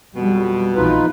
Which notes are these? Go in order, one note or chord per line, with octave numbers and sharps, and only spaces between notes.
F2 B2 F#3 G3
A#1 E3 D#4 F4 B4